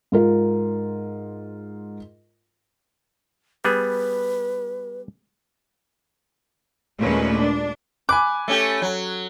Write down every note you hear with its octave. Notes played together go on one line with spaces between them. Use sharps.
G#2 F4 A#4
G3 B3 G#4 B4
D#2 A#2 G#3 A3 C#4 B4
D4
G#5 B5 D6 F#6
A3 C#4 G4
F#3